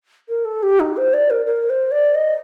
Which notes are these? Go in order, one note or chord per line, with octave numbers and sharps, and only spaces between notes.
A#4
A4
G4
D#4
C5
D5
A#4
A#4
C5
D5
D#5